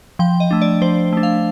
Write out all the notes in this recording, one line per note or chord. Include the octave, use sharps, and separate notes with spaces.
F3 G5
D#5
A3 D4
D5
F3 C5
A3 D4
F5